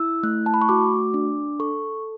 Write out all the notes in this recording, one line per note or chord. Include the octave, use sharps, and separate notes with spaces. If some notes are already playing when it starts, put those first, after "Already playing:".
Already playing: E4 E6
A3 F#6
A5
B5
C#6
F#4 D6
D4
A4 C#6